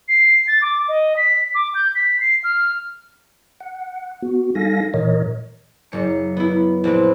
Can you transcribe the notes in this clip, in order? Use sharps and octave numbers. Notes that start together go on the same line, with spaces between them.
C7
A6
D6
D#5
B6
D6
G6
B6
C7
F6
F#5
B3 F#4
G3 D#4 A4 F5 G#5 A#6
A#2 E3 A#4 C#5 D#5
F#1 C#7
B3 E4
A#1 C4 B4